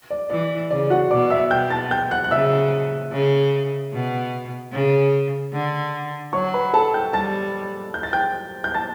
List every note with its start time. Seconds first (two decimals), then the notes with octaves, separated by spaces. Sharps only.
0.10 D5
0.30 E3 D5
0.71 C#3 D5
0.90 F#4 F#5
1.10 B2 D5 D6
1.30 E5 E6
1.50 B2 G5 G6
1.70 A5 A6
1.91 G5 G6
2.11 F#5 F#6
2.24 F#6
2.31 C#3 E5 E6
3.12 C#3
3.93 B2
4.73 C#3
5.53 D3
6.33 F#3 C#5 C#6
6.54 B4 B5
6.73 A4 A5
6.93 G5 G6
7.13 G3 A5 A6
7.94 G6
8.03 A6
8.13 G5 G6
8.64 G6
8.74 A5 A6